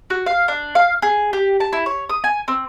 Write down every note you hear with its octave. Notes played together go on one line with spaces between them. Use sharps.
F#4
F5
D4
F5
G#4
G4
A5
E4
C#5
D#6
G#5
C4